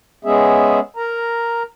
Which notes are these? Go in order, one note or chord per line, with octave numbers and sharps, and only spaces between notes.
G#3 B3 C#4 G#4 E5
A#4 A#5